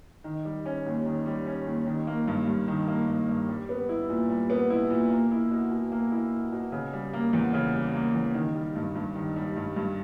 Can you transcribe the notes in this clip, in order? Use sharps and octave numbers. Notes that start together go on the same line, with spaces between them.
D#3
G3
C#4
D#2
D#3
G3
C#4
D#2
D#3
A#3
G2
G2
D#3
A#3
G2
G2
G3
B3
E4
A#2
G3
B3
E4
A#2
A#3
E4
B2
B2
A#3
E4
B2
B2
C#3
G3
A#3
E2
C#3
G3
A#3
E2
D#3
G3
G2
G2
D#3
G3
G2
G2